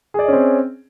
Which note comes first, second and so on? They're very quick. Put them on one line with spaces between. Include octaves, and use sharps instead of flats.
G#4 D5 D#5 C#4 C4